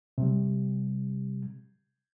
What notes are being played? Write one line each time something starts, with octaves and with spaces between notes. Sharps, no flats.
C3 G3